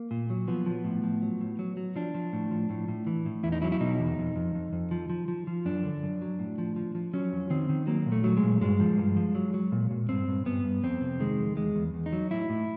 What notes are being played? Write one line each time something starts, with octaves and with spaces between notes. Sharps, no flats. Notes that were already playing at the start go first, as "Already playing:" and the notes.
Already playing: A#3
A#2
F#3
F3 B3
F3
A2
F3
F#3
A2
F#3
F#3
F3 D4
F3
A2
F3
A2
A2
E3
A2
E2 E4
D#4
F#3 E4
E4
B2 D#4
E2
F2
F2
F2
F2
F3
F3
F3
F3
F#2 D4
D3
F#2
F#3
A2
F3
F3
F3
F#3 C#4
F2
D#3 C4
D#3
F#3 A#3
A#2
A3
F#3
G#3
A#2
G2 G#3
F3
G2
F3
F#3
F#3
A#2
A#2
G2 C4
G2
G2 B3
G2
F2 C4
C3
D#3 G#3
F2
E2 G#3
E2
E2
D#4
F#3
A2 E4
A2